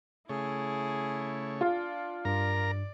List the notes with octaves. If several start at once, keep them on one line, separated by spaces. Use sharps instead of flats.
C#3 A3 E4 G#4 C#5
D4 F4
G2 A#4 D5 A#5